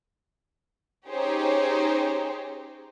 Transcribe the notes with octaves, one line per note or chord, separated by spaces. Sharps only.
C#4 D#4 G4 G#4 C5 C#5